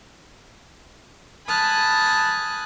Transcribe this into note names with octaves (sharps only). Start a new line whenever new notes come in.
G#5 A5 B5 D#6 F6 F#6